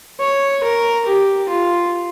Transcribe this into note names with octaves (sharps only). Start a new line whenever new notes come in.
C#5
A#4
G4
F4